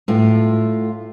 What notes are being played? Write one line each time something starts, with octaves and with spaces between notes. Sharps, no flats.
A2 F4